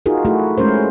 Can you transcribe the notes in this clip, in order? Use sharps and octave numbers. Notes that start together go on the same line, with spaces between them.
D#4 F4 F#4 G#4 A#4
A3 E4 F#4 G#4
G#3 A3 C#4 A#4 C5